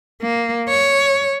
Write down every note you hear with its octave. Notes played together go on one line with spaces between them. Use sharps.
A#3
C#5